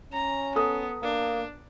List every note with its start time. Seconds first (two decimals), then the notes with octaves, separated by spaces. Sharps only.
0.12 C#4 A#5
0.56 B3 A4 D#6
1.03 A#3 D4